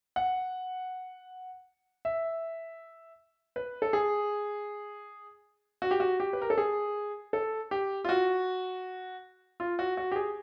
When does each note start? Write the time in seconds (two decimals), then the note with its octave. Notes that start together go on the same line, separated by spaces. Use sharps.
0.16 F#5
2.05 E5
3.56 B4
3.82 A4
3.93 G#4
5.82 F#4
5.91 G4
6.00 F#4
6.20 G4
6.33 B4
6.42 A#4
6.50 A4
6.58 G#4
7.33 A4
7.71 G4
8.04 F4
8.09 F#4
9.60 F4
9.79 F#4
9.97 F#4
10.12 G4
10.16 G#4